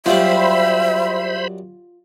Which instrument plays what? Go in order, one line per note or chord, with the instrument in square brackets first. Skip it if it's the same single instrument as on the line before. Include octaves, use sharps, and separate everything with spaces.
[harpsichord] F#2 G3 [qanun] F4 [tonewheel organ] C5 B5 [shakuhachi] E5